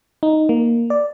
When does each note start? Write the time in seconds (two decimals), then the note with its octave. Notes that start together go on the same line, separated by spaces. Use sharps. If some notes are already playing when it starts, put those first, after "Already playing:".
0.23 D#4
0.49 A#3
0.90 D5